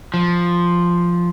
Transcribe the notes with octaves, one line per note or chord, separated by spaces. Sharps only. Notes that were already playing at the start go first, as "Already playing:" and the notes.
F3